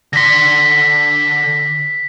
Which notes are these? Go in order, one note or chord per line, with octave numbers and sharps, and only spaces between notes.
D3 C6 A#6 B6